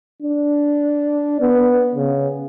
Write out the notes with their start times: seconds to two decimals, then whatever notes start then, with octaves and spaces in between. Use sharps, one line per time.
0.22 D4
1.41 B3
1.95 C#3